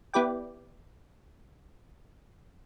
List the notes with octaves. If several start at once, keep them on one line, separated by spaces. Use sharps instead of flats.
B3 E4 G4 B4 D5 G5